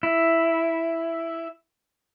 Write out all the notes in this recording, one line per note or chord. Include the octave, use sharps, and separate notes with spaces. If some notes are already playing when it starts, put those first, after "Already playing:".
E4